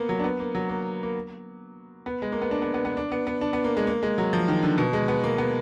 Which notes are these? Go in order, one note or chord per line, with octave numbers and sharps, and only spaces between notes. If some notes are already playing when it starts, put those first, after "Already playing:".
Already playing: A#3 B3
F#3
D4
B3
A#3
F#3
A#3
A#3
B3
G#3
A#3
B3
D4
B3
B3
B3
D4
B3
B3
D4
B3
A#3
G#3
A#3
G#3
F#3
F3
D#3
D3
B2
G#3
B3
A#3
B3